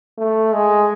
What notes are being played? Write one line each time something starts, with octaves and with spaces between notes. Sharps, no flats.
A3
G#3